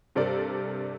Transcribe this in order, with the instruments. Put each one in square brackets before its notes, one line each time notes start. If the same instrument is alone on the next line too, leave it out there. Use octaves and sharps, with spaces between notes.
[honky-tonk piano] G2 C3 A4 A#4 C5 D5